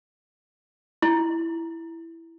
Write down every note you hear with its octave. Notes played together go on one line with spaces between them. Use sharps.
E4